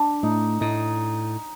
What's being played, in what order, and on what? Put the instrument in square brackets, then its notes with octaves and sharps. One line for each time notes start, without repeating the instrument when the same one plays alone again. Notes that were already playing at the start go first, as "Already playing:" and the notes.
Already playing: [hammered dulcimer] D4
[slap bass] A2 [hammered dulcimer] D#4
[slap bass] A2 [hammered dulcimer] D#4